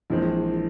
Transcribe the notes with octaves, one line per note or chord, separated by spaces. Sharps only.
A#1 A#2 E3 F3 G#3 C4